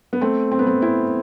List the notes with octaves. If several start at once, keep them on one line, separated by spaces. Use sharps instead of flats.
B3
A3 C4
C4
B3
A3 C4
C4 E4